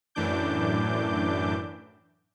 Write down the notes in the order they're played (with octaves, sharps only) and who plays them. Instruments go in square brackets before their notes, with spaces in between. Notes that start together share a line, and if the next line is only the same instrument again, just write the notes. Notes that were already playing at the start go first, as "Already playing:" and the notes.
[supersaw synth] F#2 A2 E3 D4 D6 G6